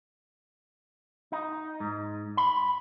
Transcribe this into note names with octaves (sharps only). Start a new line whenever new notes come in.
D#4
G#2
B5